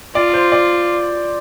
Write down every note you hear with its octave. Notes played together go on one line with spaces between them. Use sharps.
F4 D5
C5
D5